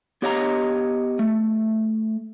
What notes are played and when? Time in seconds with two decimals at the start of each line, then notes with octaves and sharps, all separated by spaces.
0.22 B3 G4 C#5 D#5 F5 A#5
1.19 A3